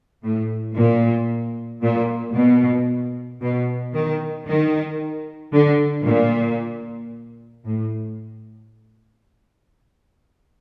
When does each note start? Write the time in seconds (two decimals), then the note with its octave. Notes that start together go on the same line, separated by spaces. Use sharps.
0.23 A2
0.77 A#2
1.82 A#2
2.35 B2
3.42 B2
3.94 D#3
4.48 D#3
5.53 D3
6.06 A#2
7.65 A2